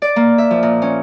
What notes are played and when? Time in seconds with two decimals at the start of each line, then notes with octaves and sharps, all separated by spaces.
0.02 D5
0.16 A#3
0.38 E5
0.51 F3
0.63 A#2
0.82 C#4